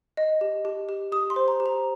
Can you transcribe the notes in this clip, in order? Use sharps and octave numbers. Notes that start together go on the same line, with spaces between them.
D#5
G4
G4
G4
G4 D#6
C6
C5
A#5
G4
A#5